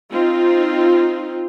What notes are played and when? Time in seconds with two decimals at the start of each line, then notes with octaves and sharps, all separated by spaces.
0.11 C4 D#4 F4